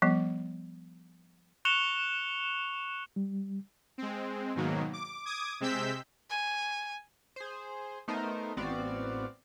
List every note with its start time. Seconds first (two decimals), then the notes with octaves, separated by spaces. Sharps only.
0.02 F3 G3 B3
1.65 C#6 F#6 C#7 E7 F7 G7
3.16 G3
3.98 G#3 C4
4.55 G#2 B2 D#3 F#3 A#3
4.93 D6
5.25 D6 D#6 G#6
5.60 C3 G#3 C4 E6 G6 B6
6.30 G#5
7.36 G#4 C5
8.08 A3 B3 D#4 A#4 C5 D#5
8.57 A1 B3 C4 F#4 D5 F5